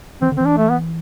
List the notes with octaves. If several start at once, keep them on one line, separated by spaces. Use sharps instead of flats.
E3 C4
D3
E3 C4
D4
A3
B3